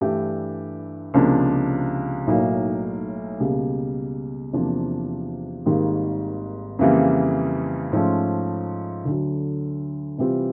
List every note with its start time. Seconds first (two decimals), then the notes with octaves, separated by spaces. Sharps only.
0.01 G2 E3 A3 D4 G4
1.14 C#2 C3 F3 A#3 D4
2.27 B1 A2 F#3 A#3 D#4
3.40 C#2 B2 G3 A#3
4.53 E2 C3 F3 A#3 D4
5.66 G#1 G#2 D#3 G3 A#3
6.79 F2 C#3 E3 G3 A#3
7.92 G#2 F3 A3 C#4
9.05 D2 D3 F#3
10.18 C3 E3 G3 C4 F4